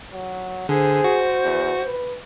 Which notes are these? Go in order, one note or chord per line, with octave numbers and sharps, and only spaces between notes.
F#3
D3 G#4 C5
F#4
E2
B4